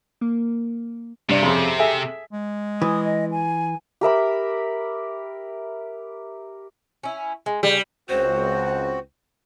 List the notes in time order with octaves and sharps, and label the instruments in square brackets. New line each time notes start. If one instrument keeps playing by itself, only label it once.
[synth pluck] A#3
[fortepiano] G2 D5 [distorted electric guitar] C3
[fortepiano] F2 C#3 C6
G#4 A4 E5
[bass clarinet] G#3
[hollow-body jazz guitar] E3 [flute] D#6
[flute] D#5
G#5
[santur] G4 A#4 E5 B5
[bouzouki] C#4 E4
G#3
[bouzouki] C#3 [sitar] G3
[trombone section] C#2 [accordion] C4 F#4 [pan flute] C5